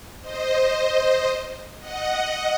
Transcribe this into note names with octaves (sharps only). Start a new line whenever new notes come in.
C5 D#5
D#5 F#5